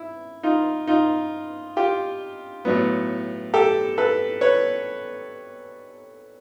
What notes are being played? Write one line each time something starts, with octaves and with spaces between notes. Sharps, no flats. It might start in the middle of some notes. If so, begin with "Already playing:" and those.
Already playing: E4
D#4 F4
D#4 F4
F4 G4
A2 F#3 B3
G4 A4
A4 B4
B4 C#5